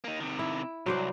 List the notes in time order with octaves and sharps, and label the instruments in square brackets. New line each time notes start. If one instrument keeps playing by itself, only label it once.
[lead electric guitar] A#3 D#4
C3 D#3
[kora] E4
[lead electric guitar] C2 [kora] F#3 C5 D5